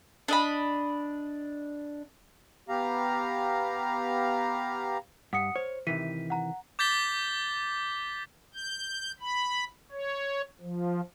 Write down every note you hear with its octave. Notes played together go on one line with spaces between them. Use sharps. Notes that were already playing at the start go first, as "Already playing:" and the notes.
D4 D#5 B5
B3 G4 F5 A#5
G2 F#5 D#6 C#7
C5 C#5
C3 D#3 E3 B6 D#7
F#5 A#5
D6 G6 A6 B6 G7
G6
B5
C#5
F3